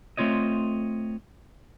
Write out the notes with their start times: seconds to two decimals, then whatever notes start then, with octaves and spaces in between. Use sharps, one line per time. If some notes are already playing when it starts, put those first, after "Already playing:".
0.17 A3 C4 F4 C#5 D#5